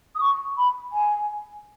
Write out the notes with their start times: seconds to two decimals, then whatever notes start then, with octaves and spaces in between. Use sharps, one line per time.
0.15 D#6
0.20 C#6
0.57 B5
0.92 G#5